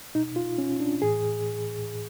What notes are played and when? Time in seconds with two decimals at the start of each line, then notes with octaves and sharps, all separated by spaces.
0.15 B2 D#4
0.36 F4
0.58 C#4
0.80 D4
1.01 A2 E3 G#4